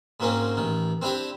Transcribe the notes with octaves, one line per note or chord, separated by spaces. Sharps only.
G#2 F#3 A#3 C4 C#4
A1 D#3
C4 D4 E4 G4 E5